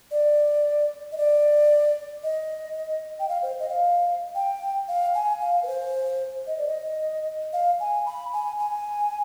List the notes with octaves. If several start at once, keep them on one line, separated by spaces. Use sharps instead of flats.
D5
D#5
D5
D#5
G5
F5
C5
D#5
F5
G5
F5
G#5
F5
B4
C5
D#5
D5
D#5
F5
G#5
B5
G#5
G#5